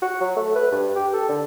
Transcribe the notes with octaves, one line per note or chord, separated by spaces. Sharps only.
F#4
F#3
A3
B4
G2
G4
A4
D3